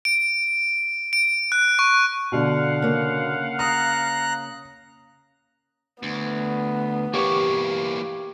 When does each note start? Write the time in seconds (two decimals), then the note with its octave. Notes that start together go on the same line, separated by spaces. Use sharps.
0.05 D7
1.13 D7
1.52 F#6
1.79 C#6
2.32 B2 D3 F5 F#5
2.82 C#3 A#3
3.59 A#5 D#6 F#6
6.03 D2 B3
7.14 E3 A#3 G4 C#5 C#6